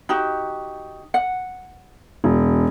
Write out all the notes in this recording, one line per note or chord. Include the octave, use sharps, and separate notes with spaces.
D#4 F#4 G4
F#5
E1